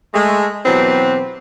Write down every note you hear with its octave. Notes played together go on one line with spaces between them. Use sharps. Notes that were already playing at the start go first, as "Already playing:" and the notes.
G#3 A3
B2 E3 F#3 C4 G4 B4